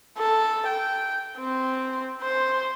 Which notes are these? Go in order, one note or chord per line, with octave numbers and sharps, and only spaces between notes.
A4
G5
C4
C5